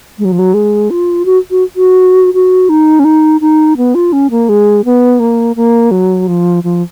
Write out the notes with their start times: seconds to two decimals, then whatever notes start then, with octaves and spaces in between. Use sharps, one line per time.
0.19 G#3
0.25 F#3
0.32 F3
0.39 F#3
0.54 G#3
0.90 F4
1.25 F#4
1.51 F#4
1.76 F#4
2.34 F#4
2.69 D#4
2.99 C#4
3.04 D#4
3.41 D#4
3.77 B3
3.95 F4
4.13 C#4
4.31 A#3
4.49 G#3
4.85 B3
5.20 A#3
5.56 A#3
5.91 F#3
6.28 F3
6.64 F3